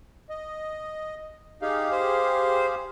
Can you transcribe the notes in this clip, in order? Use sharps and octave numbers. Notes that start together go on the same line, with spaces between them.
D#5
D#4 G4 G#4 F5
C5